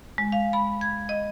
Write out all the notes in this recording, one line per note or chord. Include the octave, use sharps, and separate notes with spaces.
G#3
F5
B5
G#6
D#5